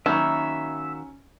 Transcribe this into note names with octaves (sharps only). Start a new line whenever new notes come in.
D#3 F#3 A#3 C#4 E5 B5 C#6